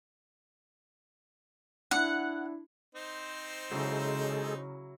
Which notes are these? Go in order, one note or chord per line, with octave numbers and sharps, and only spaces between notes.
D4 E4 F#5
C4 D#4 C5
C#3 F#3 G#3 E4 G#4 A4